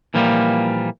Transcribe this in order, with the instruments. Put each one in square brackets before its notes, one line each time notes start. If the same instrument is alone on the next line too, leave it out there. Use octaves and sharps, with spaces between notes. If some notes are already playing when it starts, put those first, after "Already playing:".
[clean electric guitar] A#2 E3 F3 G3 A#3